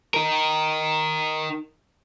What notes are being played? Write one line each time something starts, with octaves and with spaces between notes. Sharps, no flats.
D#4 A#4